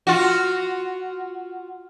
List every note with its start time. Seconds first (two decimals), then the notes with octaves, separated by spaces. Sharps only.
0.07 F4 F#4